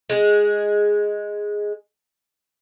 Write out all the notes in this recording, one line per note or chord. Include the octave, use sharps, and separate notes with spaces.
G#3 G#4